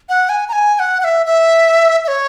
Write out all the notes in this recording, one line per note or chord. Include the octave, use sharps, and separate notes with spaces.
F#5
G#5
A#5
G#5
G#5
F#5
F#5
E5
E5
E5
C#5